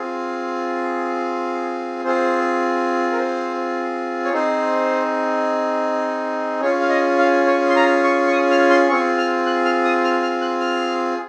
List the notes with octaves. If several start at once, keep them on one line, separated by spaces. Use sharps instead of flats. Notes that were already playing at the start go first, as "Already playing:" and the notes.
Already playing: C4 F4 G#4
C4 F4 G#4 C5
A#4
C5
C#5
C4 D#4 G#4 C5
C#4 F4 G#4 C#5
F5
D#5
F5
C#5
C6
A#5
C#6
C#6
D#6
F6
C6
C4 F4 G#4 C#6
F6
F#6
F6
D#6
F6
F6
F#6
F6